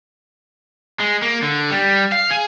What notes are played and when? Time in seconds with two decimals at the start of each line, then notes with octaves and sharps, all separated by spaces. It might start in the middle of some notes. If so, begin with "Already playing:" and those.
1.00 G#3
1.23 A#3
1.43 D3
1.71 G3
2.12 F5
2.30 G#4